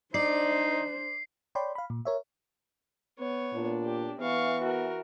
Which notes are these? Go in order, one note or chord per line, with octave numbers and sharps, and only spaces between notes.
D4 D#4 C5 D5 C7
C#5 D5 G5 B5 C6
F5 B5
A#2
A#4 C#5 E5
B3 C#5
A#2 D4
G4
E3 B3 F5 C#6
F#4 A#4